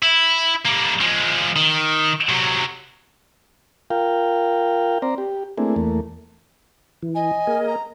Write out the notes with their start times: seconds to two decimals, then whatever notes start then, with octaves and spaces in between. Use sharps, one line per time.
0.03 E4
0.65 G3 A#3
1.00 F3 G#3
1.56 D#3
2.29 C3 F#3
3.90 F4 A#4 F5 G5
5.02 C4 C5 D5 A#5
5.18 G4
5.58 A3 A#3 C4 D4 E4 G#4
5.76 E2 A3 A#3
7.02 E3
7.15 D#5 G#5
7.47 A#3 G#4 A#4
7.67 A#5